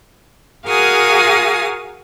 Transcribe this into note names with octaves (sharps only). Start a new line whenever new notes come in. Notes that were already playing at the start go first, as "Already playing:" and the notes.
F#4 G#4 A#4 F5 G#5 D#6